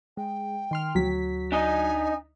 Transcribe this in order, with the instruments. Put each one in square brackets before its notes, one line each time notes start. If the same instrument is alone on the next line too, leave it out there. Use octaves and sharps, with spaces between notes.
[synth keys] G#3 [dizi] G5
[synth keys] D#3 C6 F6
[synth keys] D2 B6 [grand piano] F#3
[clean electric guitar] D4 D#4 D#5 [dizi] G#5